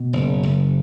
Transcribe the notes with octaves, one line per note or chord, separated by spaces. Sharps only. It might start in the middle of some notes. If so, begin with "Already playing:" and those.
Already playing: B2
F#1
F#1